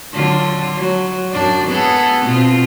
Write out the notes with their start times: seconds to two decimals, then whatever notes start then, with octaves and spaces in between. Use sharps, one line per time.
0.13 D3 F#3 F4
0.76 F#3
1.32 F#2 D4 D5
1.67 B3 G#4 A4
2.26 B2 C4 F4